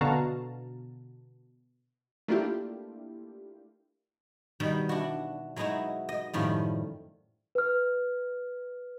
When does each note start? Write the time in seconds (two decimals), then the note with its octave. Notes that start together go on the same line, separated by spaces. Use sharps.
0.01 B2 D3 F#4 F5 A5 A#5
2.28 A3 A#3 D4 E4 F4 G4
4.60 B2 D#3 G3
4.89 D4 E4 F#4
5.56 F#3 G#3 B3 D#4 E4 F#4
6.09 D#5
6.33 F#2 A2 D#3 F3 G3
7.55 B4 F6